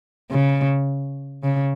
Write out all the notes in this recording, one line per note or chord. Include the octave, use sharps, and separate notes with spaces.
C#3
C#3